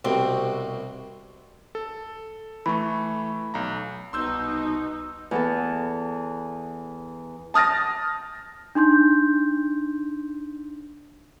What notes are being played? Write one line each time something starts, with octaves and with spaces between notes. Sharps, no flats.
C2 B2 C4
A4
E3 A3 B5 C#6
B1 A#5
C2 B2 D#4 C6 E6 G6
E2 B3 A4
A5 D#6 F6 A6 A#6
D4 D#4 C6 G6